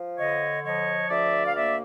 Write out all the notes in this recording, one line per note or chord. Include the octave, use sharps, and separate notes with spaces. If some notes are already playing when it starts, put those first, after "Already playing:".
Already playing: F3
D3 C#5 D#5
F3 C#5 D#5
D2 D5 E5
F5
A#3 D5 E5